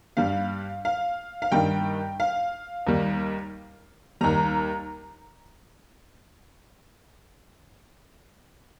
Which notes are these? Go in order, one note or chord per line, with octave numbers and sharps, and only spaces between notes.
G2 G3 F5
F5
F5
G2 D#3 G3 G5
F5
D#2 D#3 G3
D#2 D#3 G3 A#5